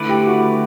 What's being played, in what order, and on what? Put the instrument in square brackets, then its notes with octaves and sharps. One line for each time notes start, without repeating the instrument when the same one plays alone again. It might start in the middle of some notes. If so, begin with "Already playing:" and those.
Already playing: [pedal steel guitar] D3 A3 E4 B4 D5
[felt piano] G4
F#4